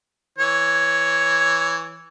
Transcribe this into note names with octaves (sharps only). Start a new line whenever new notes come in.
E3 C#5